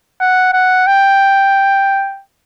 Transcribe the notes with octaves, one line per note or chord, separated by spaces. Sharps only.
F#5
F#5
G5